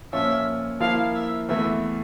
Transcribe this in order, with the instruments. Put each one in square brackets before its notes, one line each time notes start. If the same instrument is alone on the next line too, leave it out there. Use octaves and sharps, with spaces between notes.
[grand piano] A#2 F3 C#4 F4 C#5 [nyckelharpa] E5
[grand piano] F3 A#3 E4 [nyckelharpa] F5
[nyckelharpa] E5
[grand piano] E2 E3 A3 [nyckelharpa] E5